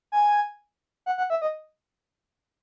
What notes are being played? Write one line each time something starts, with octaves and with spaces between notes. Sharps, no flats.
G#5
F#5
F#5
E5
D#5